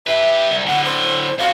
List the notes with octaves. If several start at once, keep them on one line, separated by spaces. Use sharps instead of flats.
G4 B4 E5
C2
A2 D3 F#5
C5
F2 F#4 F5